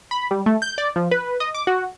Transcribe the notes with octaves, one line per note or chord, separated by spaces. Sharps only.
B5
G3
A3
G6
D5
F3
B4
D#5
D6
F#4